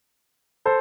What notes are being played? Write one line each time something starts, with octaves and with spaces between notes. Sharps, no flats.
A4 C5